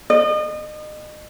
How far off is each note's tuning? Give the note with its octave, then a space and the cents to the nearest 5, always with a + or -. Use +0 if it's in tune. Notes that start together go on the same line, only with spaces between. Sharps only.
D#5 -35